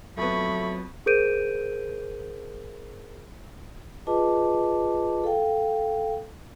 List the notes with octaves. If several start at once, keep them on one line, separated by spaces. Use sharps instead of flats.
F2 F#3 A3 B3 B5 C#6
G#4 A#4 C5 G6 D7 D#7
F4 G#4 B4 D#5 A5 D6
A4 F5 G5